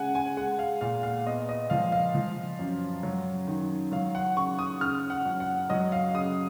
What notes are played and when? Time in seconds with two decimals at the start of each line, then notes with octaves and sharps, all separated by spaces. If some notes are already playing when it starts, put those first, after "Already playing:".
Already playing: C#3 G#3 F#5 G#5
0.15 G#5
0.37 G#3 F#5
0.59 F5
0.81 A#2 F5
1.03 F5
1.27 B3 D#5
1.49 D#5
1.70 F3 F5
1.92 F5
2.15 F3
2.59 F#2
3.03 F#3
3.47 D#3
3.92 F#3 F5
4.15 F#5
4.36 C#3 C#6
4.59 D#6
4.80 C#3 F6
5.10 F#5
5.25 F#2
5.40 F#5
5.70 F#3 D#5
5.92 F5
6.14 C#3 D#6